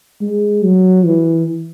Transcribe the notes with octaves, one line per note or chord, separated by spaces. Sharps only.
G#3
F#3
E3